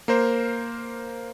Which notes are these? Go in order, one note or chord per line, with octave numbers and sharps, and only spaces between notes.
A#3 A#4 C5